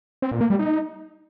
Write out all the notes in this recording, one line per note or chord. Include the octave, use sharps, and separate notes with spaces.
C4
A#2
A#3
G3
D#4